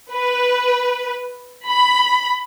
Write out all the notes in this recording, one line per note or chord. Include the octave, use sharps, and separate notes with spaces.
B4
B5